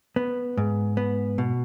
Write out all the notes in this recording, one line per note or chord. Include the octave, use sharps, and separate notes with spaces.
B3
G#2
B3
B2